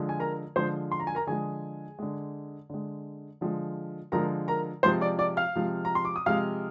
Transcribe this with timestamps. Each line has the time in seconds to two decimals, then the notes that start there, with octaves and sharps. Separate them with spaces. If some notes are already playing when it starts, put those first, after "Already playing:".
Already playing: D3 F3 G#3
0.09 G#5
0.20 A#4 A#5
0.56 D3 F3 G#3 C5 C6
0.92 C6
1.00 A#5
1.07 G#5
1.15 A#4 A#5
1.27 D3 F3 G#3 G#4 G#5
1.99 D3 G#3
2.70 D3 G#3
3.41 D3 F3 G#3
4.12 D3 F3 G#3 A#4 A#5
4.48 A#4 A#5
4.83 C3 F3 G#3 C5 C6
5.01 D5 D6
5.19 D5 D6
5.37 F5 F6
5.55 C3 F3 G#3
5.85 A#5
5.95 C6
6.05 D6
6.16 D#6
6.26 C3 F3 G#3 F5 F6